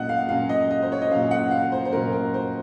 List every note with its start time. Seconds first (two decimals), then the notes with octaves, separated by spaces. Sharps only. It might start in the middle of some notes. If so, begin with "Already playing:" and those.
Already playing: A#2 F#3 C#4 D#5 F#5
0.09 F5
0.29 A#2 F#3 C#4 F5
0.49 D#5
0.71 D#5
0.82 C5
0.92 C#5
1.02 D#5
1.11 A#2 F#3 C#4 F5
1.31 F#5
1.51 F5
1.72 C5
1.85 C5
1.92 A#2 F#3 C#4 A#4
2.13 A#4
2.34 C5